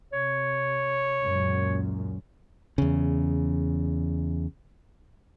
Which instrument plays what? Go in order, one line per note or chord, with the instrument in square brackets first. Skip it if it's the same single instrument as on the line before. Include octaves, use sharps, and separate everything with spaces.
[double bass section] C3 [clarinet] C#5
[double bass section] C#2 F#2 A#2
[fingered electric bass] E2 C#3